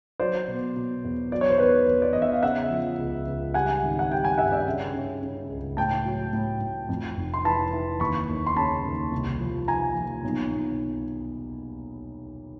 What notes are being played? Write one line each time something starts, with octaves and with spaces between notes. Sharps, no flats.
F#3 C5 D5
B2
B2
E2
F#3 D5
C#5
C5
E2 B4 C#5
E2
D5
E2 D#5
E5
F5
C#3 E5 F#5
F3
C#2
C#2
G3 F#5 G#5
G#1
F#5
G3 G5
F#5 G#5
G2 E5 F#5
D5 E5
C#3
C#3
C#3
C#2
A2 G5 A5
F#3
A2
A2
F2
F1
C6
E3 A5 B5
E3
D#2 B5 C#6
D#2
C6
C#3 A5 B5
D#2
C2
F3
F3 G#5 A#5
F3
B1
B1